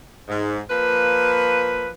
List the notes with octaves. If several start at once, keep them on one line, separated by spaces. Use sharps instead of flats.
G#2
F3 A#3 B4